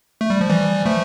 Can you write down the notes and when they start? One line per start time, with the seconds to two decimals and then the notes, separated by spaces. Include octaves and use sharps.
0.21 A3
0.30 G3
0.41 F3
0.50 E3 G3
0.86 F3 A3